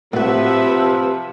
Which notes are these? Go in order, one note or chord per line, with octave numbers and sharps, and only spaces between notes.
A2 C3 F3 F#4 B4 E5 F#5